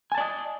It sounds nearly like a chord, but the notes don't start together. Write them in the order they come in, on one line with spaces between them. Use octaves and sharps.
G#5 A5 D5 D#5